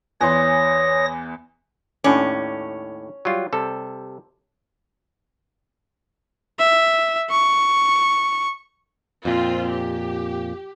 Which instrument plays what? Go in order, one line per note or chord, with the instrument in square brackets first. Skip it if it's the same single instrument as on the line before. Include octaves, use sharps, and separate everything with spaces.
[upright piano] E2 E3 C6 [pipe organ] C#5 D#6 A#6
[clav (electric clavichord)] D#2 A2 D5 [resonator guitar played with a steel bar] C#4
[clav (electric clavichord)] F#3 G3 F4
C3 G3 A4
[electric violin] E5
C#6
[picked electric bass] F2 A#2 [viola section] C4 F4
[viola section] G4